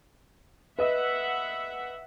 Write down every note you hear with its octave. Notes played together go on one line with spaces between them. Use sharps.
B4 D#5 E5 F#5